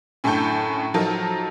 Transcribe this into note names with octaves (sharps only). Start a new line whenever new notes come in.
F#2 A2 D3 A4 C#6 G6
F3 F#3 D#4 A4 A#4